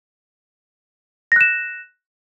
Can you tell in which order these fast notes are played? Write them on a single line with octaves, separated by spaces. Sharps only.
A#6 F#6 E7